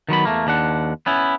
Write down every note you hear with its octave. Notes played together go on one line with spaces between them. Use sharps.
D#3 F#3 B3 B5
E2 A3 A#3
D#2 D4 F#5
B3 C#4 E4